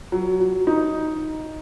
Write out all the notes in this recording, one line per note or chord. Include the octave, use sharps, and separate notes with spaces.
F#3
F#3
D#4